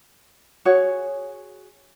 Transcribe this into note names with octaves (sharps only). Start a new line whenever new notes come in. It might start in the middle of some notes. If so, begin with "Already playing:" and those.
F#4 G#4 C#5